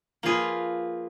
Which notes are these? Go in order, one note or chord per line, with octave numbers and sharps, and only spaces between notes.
F3 A#3 F4 G#4 B4